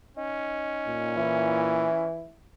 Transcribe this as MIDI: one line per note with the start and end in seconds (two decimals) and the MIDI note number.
0.17 2.06 61
0.17 1.16 63
0.87 1.91 46
1.17 2.27 52
1.17 2.37 64